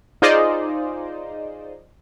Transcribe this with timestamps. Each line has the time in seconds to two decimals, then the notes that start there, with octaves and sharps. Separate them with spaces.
0.22 D#4 F4 G#4 C5 D5 D#5